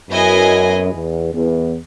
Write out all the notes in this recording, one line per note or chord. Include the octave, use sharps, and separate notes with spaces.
F#2 B3 E4 G#4 D#5 G#5
E2
E2